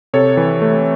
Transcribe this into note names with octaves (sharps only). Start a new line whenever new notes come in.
C3 A4 C#5
E3
A3